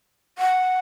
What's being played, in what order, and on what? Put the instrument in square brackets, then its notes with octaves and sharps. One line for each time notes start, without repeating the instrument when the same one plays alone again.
[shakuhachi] F#5